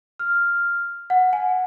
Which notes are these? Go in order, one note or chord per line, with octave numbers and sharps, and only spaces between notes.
F6
F#5
G#5